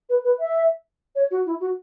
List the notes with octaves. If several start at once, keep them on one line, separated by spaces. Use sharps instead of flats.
B4
B4
E5
C#5
F#4
E4
F#4